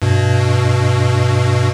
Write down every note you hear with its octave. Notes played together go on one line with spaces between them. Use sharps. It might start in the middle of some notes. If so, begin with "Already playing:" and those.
G2 B2